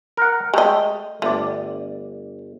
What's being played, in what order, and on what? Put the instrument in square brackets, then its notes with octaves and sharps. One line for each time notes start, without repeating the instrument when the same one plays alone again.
[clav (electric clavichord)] A#4 F#5
[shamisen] G#3 D#5 [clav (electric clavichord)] A3 G5
[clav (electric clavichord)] G1 D5 [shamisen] A3